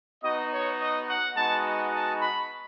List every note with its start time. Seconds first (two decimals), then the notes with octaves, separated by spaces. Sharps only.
0.24 B3 D#4 F#4 D#5
0.52 C#5
0.80 D#5
1.08 F#5
1.37 G#3 B3 D#4 F#4 A5
1.93 A5
2.22 B5